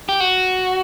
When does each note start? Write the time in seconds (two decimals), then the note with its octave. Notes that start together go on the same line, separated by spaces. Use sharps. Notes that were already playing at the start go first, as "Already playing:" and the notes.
0.09 G4
0.20 F#4